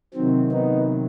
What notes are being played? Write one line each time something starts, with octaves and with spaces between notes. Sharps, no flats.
C3 D#3 F#3 C4
B3 D#4